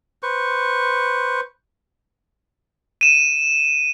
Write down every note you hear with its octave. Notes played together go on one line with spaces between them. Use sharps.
B4 C5 C#6
D#7 E7